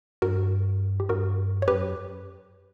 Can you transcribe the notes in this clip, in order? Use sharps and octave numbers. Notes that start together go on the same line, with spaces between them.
G2 F#4 A#4
G4
G2 F#4 A#4
C#5
F#2 G4 B4